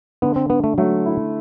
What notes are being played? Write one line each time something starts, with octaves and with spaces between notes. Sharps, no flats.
D3 B3
C4
D3 B3
A3
F#3 A3
E4